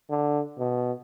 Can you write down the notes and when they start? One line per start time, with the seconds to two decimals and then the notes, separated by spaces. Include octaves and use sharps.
0.10 D3
0.58 B2